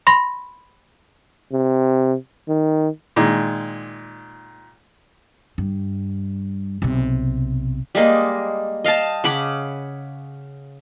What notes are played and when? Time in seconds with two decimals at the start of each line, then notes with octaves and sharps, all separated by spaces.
0.07 B5 C6 A#6
1.52 C3
2.49 D#3
3.16 A#2 D#3 G#3
5.58 G2
6.82 B1 C3
7.95 G3 G#3 A#3 D#5
8.84 D#5 F5 G5 A5
9.24 C#3 F#5 B5 D6